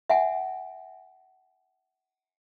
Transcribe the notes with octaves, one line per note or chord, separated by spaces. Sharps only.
E5 F#5 G#5